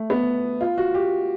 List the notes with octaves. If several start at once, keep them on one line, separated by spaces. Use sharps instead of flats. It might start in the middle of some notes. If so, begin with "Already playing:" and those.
Already playing: A3
B3
F4
F#4
G4